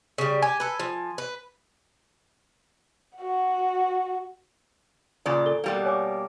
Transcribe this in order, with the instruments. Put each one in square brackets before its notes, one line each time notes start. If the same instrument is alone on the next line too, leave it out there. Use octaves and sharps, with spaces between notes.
[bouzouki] C#3 G3
[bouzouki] G4 [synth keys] G#5
[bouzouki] A4 B4
F3
B4
[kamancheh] F#4 F#5
[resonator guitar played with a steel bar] A#2 C#3 D5
[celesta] A4 G7
[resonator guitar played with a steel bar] B2 G3 A#3
[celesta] C#5 G#5 D6